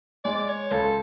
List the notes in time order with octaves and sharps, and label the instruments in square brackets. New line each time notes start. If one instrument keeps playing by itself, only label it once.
[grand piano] G#3 [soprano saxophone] D5
[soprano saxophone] C#5
[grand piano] C#2 [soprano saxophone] A4